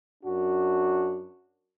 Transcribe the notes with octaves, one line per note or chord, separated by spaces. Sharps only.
F#2 D4 F#4